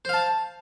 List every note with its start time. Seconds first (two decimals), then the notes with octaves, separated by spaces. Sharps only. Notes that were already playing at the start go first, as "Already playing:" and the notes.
0.05 C5
0.09 F5
0.13 A5